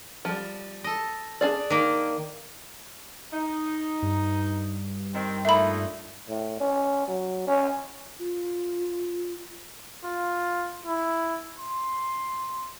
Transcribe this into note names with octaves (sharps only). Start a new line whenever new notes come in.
F3 G3
A4 D#5
D4 G#4 D5
D#3 A#3
D#4
G2
D#3 C4
A#2 A3 D#4 E5 B5
A2
C#4
F#3
C#4
F4
F4
E4
C6